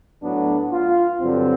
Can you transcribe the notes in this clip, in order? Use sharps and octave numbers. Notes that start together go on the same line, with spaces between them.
A2 F#3 B3 D4
F4
G2 D3 F#3 C4